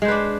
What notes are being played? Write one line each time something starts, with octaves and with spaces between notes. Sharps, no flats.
G#3 D4 B4 C5